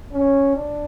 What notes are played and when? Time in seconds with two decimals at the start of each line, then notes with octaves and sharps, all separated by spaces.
0.12 C#4
0.55 D4